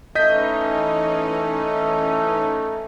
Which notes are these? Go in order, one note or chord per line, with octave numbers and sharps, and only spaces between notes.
E3 A3 C#4 D#4 D#5 G6 B6